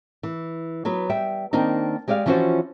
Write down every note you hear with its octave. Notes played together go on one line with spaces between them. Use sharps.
E3
F#3 B3 B4
G3 E5 G5
D#3 A#3 C4 D4 D#4
G#3 G4 D5 D#5 F5
E3 F3 C#4 F4 F#4 C5